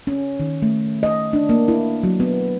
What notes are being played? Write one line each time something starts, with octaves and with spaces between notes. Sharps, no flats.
C#4
D#3
A3
D#5
D4
A#3
E4
F#3
B3